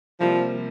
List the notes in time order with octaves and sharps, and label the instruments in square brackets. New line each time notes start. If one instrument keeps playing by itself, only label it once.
[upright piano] C3 G3 A#3 [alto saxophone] F3